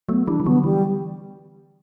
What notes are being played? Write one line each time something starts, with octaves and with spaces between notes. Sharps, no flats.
F#3 A3 B3
E3 G3 D4
E3
D3 F#3 B3
E3 G3